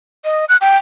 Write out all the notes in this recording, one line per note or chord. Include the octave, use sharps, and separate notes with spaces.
D#5
F#6
G5